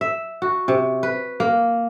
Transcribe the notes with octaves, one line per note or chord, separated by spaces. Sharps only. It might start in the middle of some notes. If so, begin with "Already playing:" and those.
E5
F#4
C3
B4
A#3